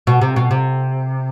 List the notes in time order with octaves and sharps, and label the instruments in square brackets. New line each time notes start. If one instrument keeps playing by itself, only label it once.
[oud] B2
C3
B2
C3